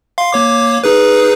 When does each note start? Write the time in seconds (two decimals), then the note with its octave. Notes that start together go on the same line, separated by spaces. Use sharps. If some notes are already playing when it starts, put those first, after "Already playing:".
0.18 F5 C6
0.33 A#3 C#5 D6
0.84 D#4 G#4 B4